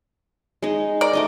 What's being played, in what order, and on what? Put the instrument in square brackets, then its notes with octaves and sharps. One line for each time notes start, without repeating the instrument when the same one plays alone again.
[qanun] G#3 D#4
[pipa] A#4 D5
[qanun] A3 D#4 D#5